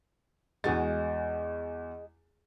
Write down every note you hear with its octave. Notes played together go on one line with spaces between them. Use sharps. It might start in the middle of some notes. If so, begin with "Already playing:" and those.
E2 G#3 F#4 G#4 A6